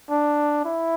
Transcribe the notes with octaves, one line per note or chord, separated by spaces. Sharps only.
D4
E4